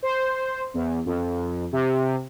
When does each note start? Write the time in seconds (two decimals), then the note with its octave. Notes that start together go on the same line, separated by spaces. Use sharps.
0.03 C5
0.74 E2
1.06 F2
1.72 C3